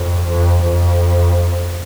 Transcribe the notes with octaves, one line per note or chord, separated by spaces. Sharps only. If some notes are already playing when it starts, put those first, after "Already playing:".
Already playing: F2
F2
F2